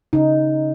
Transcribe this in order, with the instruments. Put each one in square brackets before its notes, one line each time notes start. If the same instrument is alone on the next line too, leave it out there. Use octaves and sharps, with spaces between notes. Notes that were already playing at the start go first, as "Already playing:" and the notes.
[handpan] C#3 D#4